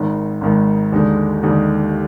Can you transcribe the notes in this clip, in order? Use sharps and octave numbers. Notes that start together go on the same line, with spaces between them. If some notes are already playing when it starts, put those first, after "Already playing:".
Already playing: G#1 G#2 D#3
G#1 G#2 D#3
D#2 D3 G#3 D#4
D#2 D3 G#3 D#4